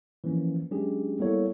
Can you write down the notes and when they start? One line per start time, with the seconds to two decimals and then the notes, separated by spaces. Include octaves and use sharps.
0.24 E3 F3 A#3 C#4
0.71 F#3 G#3 C#4 D4 G4 G#4
1.19 G3 A#3 B3 E4 A4 C#5